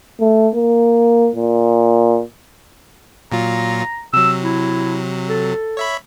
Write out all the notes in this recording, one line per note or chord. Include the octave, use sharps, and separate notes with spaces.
A3
A#3
A#2
A#2 F#3 F4 A#5
C3 F#3 E6
E4
A4
C#5 E5 B5